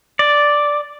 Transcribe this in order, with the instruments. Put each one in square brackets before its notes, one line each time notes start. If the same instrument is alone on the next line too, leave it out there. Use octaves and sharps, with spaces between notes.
[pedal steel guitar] D5